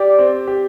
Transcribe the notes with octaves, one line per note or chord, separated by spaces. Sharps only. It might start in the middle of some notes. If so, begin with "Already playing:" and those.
Already playing: G4 D5
C4
G4